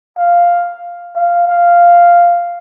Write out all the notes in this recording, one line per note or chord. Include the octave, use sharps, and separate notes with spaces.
F5
F5
F5